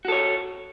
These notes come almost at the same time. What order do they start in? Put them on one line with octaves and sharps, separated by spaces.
F#4 A4 C#5